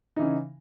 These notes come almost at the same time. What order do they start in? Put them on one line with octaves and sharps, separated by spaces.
D#4 E3 C#3